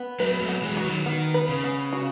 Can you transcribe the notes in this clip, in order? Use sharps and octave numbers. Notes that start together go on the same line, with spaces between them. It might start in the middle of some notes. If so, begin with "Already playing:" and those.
Already playing: B3
F#3 A3 B4
F#3 A3
B3
E3 G#3
F#4
D#3 F#3
D#3 B3
B4
C#3
B3
F#4